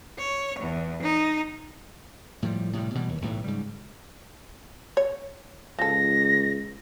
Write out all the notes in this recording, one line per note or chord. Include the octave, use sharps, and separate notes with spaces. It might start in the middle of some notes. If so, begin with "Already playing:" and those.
C#5
E2
D#4
A2 F3 G3
A2 C3 G3
B2 E3 G3
D#2
B1 A2 E3
G#2 C#3 G3
C#5
C#2 F3 A4 A#6